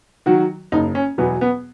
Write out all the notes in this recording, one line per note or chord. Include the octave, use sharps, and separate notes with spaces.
D#3 F#3 F#4
F#1 D#4
C#4
E2 B2 F#3 B3
B3